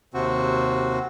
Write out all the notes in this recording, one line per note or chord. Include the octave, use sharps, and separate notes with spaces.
D#2 C3 C4 F#4